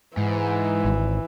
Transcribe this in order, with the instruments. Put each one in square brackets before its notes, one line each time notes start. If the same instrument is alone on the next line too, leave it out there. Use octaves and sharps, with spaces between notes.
[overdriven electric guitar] G#2 [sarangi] E3
[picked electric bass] G#1